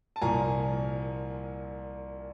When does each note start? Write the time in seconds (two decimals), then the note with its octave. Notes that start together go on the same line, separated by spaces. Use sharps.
0.16 A5
0.21 C2 A#2 F3 A#3 G#5 A#5